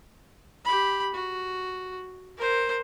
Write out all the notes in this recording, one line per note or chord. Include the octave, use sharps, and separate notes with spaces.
G4 B5
F#4
A#4 C5